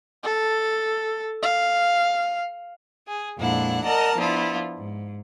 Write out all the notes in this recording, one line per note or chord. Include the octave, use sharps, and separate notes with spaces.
A4
F5
G#4
F2 A#2 G#3 D4 E4 F#5
A#4 D5 D#5 F#5 A5 A#5
F3 B3 D4 E4 F4
G#2